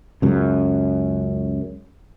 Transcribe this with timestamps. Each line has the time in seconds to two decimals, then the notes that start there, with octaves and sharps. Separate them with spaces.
0.22 C#2 F#2 C#3